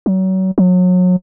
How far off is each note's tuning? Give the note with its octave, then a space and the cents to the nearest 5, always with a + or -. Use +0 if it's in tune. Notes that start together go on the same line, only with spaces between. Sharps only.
F#3 +30
F#3 -30